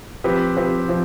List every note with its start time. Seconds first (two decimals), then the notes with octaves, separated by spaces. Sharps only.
0.24 F3 C4 G4 B4
0.56 F3 C4 G4 B4
0.88 F3 C4